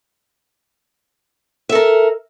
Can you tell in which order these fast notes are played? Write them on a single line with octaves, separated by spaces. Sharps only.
E5 A4 A#4